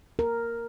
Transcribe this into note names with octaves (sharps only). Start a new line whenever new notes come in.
A#4